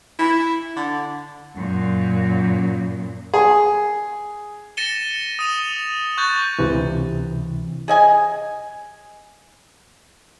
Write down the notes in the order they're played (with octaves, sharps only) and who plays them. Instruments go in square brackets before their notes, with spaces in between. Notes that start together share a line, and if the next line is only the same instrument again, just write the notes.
[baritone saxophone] E4
D3
[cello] F#2 A#2
[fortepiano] G#4
[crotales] A6 A#6 C#7 D#7 E7 G7
D#6 D#7 F7
C#6 F#6 G6 A6
[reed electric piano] C#2 C3 E3
[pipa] G#4 D#5 G#5